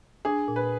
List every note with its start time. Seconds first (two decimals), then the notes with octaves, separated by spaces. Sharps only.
0.25 D4 G#4
0.48 A#2
0.56 B4